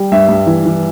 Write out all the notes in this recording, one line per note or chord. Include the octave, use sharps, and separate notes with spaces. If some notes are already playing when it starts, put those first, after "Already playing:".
Already playing: G3
G2 E5
G2
E3
E3